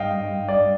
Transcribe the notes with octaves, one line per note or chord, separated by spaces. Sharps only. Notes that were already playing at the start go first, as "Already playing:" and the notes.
Already playing: G2 D#5 F5 G5
D5